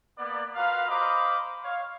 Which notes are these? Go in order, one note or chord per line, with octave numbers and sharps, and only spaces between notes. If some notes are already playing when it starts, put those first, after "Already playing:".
A#3 B3 D5
F4 F#4 A#4 B4 F5
C5 D#5 F5 A#5 B5 D6
C#5 F5